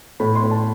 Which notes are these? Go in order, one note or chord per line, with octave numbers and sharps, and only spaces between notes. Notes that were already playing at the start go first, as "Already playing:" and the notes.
A2 B5
C6
A2
A5